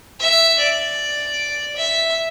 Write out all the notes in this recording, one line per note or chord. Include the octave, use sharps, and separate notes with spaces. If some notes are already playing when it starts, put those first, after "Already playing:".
E5
D5
E5